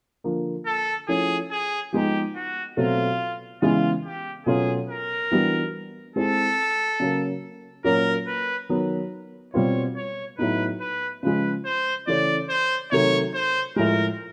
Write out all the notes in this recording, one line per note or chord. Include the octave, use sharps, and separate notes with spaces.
D3 F3 A#3
A4
F3 A3 C#4 E4 G#4
G#4
F3 G#3 B3 D#4 G4
F#4
B2 F#3 A3 C4 F4
C#3 E3 G#3 B3 F4
G4
B2 F#3 A3 C#4 F4 G#4
A#4
E3 G3 B3 D4 F#4
G#3 C4 E4 G#4 A4
C#3 F#3 A#3
A#2 F#3 A#3 C#4 F#4 A#4
B4
D#3 F#3 B3
B2 G3 C4 F4 C#5
C#5
A2 F#3 B3 D#4 B4
B4
C#3 F3 G#3 B4
C5
C#3 E3 A3 C#4 D5
C5
C3 D#3 F#3 A3 C#5
C5
A2 F3 G#3 A#4